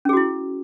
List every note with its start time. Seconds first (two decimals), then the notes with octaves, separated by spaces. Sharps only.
0.05 C#4
0.09 G#4
0.13 F#4
0.17 E4